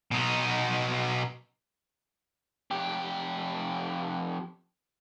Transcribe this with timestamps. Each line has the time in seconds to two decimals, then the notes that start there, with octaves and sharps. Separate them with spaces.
0.12 B2 D#4
2.71 F2 G4